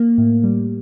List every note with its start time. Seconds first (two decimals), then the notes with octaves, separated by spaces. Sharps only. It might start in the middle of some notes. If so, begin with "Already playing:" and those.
Already playing: A#3
0.18 A2
0.44 G3